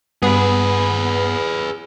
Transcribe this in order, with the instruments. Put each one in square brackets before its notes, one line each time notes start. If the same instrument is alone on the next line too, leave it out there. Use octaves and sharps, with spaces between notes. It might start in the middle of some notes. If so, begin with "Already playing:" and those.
[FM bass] G2 [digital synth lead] B3 [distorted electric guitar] G#4 B4